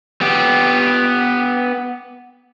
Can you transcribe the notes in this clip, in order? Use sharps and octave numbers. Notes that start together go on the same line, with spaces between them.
B3 G4